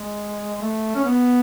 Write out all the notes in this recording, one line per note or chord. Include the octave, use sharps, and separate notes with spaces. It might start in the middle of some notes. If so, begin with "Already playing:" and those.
Already playing: G#3
A3
C#4
B3